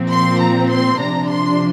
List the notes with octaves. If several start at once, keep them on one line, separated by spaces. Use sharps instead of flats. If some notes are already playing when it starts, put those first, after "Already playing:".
Already playing: A#2 F3 C4
C6
A#5
C6
C3 F3 D4 A#5
C6